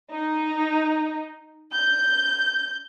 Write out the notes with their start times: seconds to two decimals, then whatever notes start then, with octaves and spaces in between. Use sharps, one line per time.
0.11 D#4
1.73 G6